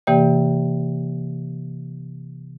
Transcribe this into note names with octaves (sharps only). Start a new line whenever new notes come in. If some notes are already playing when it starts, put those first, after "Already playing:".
C3 E3 A#3 G4 D5 G5